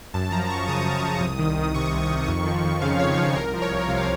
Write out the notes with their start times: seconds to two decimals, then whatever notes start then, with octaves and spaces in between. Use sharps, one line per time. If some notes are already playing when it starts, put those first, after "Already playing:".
0.14 F#2 A5
0.32 F3 A#5
0.50 F#2 C#6
0.68 C#3 D#6
0.86 F#2 D#6
1.04 F3
1.21 C2
1.39 D#3
1.57 C2
1.74 C3 C#6
1.93 C2
2.10 D#3
2.28 F2
2.46 F3
2.64 F2
2.82 C#3 F5
2.99 F2 C#5
3.18 F3
3.36 C2 A#4
3.54 F3
3.62 C#5
3.71 C2
3.88 C3 F5